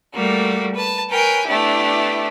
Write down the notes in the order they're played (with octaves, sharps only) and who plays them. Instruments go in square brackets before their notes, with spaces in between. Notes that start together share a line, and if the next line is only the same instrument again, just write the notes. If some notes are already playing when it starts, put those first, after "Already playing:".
[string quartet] G3 A3 A#3 F#4
B4 A5
A#4 B4 C#5 G5 G#5
A3 B3 D4 E4 G4